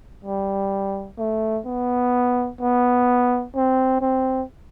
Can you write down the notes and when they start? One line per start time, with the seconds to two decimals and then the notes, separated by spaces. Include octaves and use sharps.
0.25 G3
1.18 A3
1.66 B3
2.61 B3
3.55 C4
4.01 C4